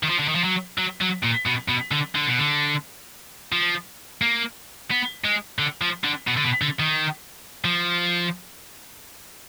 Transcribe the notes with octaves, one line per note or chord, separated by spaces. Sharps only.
D#3
F3
D3
D#3
F3
F#3
F#3
F#3
A#2
B2
B2
D3
D3
B2
D3
F3
A#3
B3
G#3
D3
F3
D3
B2
D3
B2
D3
D#3
F3